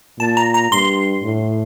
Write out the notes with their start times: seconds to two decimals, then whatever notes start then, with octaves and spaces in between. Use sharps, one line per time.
0.19 A#2 A5
0.37 A#5
0.54 A#5
0.71 G2 C6
1.23 A2